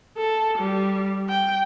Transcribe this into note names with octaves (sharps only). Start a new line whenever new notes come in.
A4
G3
G5